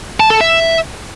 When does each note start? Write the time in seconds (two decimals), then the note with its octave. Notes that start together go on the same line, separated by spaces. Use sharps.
0.20 A5
0.30 A4
0.41 E5